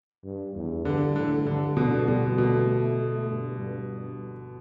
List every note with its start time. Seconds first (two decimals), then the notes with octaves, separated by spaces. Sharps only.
0.24 G2
0.55 E2
0.85 G2 D3
1.16 A2 D3
1.47 G2 D3
1.77 B2 D3
2.08 B2 G3
2.38 B2 A3
2.68 A3
2.99 A3
3.30 G2
3.60 G2